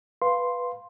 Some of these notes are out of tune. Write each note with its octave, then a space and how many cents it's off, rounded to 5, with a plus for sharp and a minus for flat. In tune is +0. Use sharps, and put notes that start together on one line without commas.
B4 +0 F5 +0 C6 +0